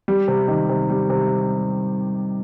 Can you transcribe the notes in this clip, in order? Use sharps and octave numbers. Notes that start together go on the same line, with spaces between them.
G3
C3
D#3
C3
G3
C3